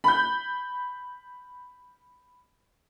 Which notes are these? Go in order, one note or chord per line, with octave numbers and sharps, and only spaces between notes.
B5 G6